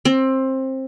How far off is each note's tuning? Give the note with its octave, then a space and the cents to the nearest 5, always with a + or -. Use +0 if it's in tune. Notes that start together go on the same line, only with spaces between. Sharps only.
C4 +20